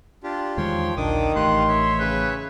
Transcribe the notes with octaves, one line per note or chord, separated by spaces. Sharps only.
D4 F4 G4
E2 D#3 F3 G#3 C#5 G5 C6
A#1 D#2 D3 D#3 D4 D6 D#6
A1 A2 G4 F5 C6 F#6
C#5 E5
C#3 B4